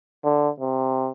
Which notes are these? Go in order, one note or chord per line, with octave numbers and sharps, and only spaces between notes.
D3
C3